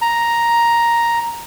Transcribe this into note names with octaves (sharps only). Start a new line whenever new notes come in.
A#5